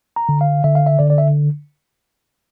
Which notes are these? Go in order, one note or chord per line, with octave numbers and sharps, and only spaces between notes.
A#5
D3
F5
D3 E5
F5
E5
D3 D5
D5
E5